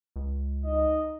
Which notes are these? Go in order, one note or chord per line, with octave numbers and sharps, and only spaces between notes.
C#2
D#4 D#5